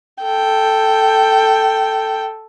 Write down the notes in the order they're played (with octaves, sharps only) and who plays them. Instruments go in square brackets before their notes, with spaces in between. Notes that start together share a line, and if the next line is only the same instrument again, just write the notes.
[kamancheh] A4 G5